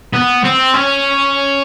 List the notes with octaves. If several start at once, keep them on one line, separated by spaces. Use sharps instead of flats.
B3
C4
C#4